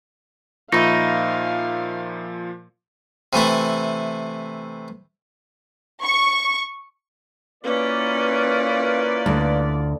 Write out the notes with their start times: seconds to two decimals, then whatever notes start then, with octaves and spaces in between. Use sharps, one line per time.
0.72 A#2 F3 D#4 E5 F5 B5 C#6 A#6
3.33 C3 E3 A3 E4
6.03 C#6
7.64 A#3 C#4 E4 F4 B4 D5
9.26 D2